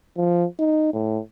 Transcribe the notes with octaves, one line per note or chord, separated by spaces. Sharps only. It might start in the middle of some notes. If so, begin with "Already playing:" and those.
F3
D#4
A2